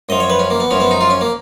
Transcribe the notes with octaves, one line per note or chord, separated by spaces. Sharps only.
F#2 F3 D#5
C#5
B4
C#4
A#3
B3
F#2 F3 C#4
B3
D#4
F4
C#4
A#3